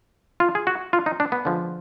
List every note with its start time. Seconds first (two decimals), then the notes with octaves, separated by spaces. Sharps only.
0.40 F4
0.55 G#4
0.67 F#4
0.93 F4
1.06 D#4
1.20 D4
1.32 B3
1.45 D3 F3 G#3